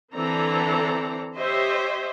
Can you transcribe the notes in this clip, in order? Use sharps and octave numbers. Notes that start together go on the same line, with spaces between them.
D3 E3 C4 A4 D5 A#5
G4 C5 C#5 D#5 E5